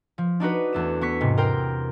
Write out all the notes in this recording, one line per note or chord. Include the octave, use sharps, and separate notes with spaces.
F3
D4 D#4 F#4 B4
E2 A3 E7
B3 C#6 B6
G#2 C3
A#4 C5 G5